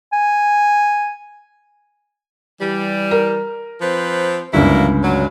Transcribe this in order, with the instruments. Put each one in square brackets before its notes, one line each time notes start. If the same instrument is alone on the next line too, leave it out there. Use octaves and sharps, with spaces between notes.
[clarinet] G#5
[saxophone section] E3 G3
[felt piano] A#4
[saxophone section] F3 C4 B4
[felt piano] G1 C#2 [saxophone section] F#3 A#3 E4
[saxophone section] F#3